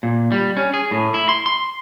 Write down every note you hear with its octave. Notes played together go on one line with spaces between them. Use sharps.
A#2
G3
C#4
G#4
A2
E4
C6
C6